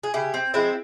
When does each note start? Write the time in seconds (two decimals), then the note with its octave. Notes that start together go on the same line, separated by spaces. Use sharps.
0.03 G#4
0.14 C#3 E4 G4
0.34 C4
0.54 F3 G#3 C4 E4